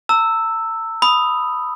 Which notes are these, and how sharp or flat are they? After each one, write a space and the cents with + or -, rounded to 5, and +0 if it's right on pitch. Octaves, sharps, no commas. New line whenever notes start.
A#5 -45 E6 +0
B5 +0 D#6 +0